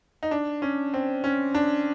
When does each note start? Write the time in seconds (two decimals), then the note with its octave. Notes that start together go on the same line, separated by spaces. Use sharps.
0.23 D#4
0.31 D4
0.62 C#4
0.94 C4
1.24 C#4
1.54 D4